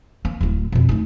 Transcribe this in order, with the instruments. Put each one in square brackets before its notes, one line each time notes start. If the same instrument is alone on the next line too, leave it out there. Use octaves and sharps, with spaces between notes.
[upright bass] A#3
D1 E4
F2 B2
A3 D#4